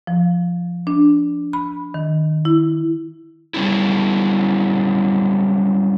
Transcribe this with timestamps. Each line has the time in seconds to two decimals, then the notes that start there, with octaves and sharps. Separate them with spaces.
0.07 F3
0.87 D4
1.53 B5
1.94 D#3
2.45 E4
3.54 F#3 G3 C#4 E4